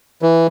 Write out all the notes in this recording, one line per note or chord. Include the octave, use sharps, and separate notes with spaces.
E3